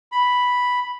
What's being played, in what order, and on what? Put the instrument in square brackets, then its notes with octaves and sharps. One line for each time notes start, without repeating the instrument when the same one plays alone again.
[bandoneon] B5